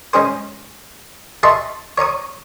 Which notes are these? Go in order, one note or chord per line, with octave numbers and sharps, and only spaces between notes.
G#3 C#4 G#4 C5
G#4 D#5 E5 A5 C6 C#6
C#5 A#5 C#6 D#6